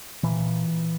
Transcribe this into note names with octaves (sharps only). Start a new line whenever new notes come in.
A#2 E3